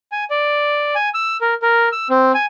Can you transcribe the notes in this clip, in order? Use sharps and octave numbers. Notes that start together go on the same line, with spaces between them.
G#5
D5
G#5
E6
A#4
A#4
E6
C4
G#5